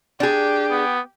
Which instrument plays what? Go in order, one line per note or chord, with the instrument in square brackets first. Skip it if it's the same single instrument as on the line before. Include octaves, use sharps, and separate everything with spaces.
[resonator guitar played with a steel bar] D4 G#4 [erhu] G4
[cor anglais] B3